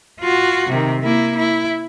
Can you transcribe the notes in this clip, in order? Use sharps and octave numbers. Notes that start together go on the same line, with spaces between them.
F4 F#4
C3 D#3
A#3 E4
E4